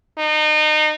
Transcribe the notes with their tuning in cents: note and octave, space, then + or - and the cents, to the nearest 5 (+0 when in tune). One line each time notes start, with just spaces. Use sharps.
D#4 -30